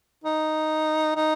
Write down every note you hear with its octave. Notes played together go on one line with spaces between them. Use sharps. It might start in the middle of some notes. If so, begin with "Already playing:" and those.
D#4
D#4